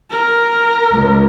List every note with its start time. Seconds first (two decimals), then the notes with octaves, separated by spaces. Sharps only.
0.11 A#4
0.93 C#2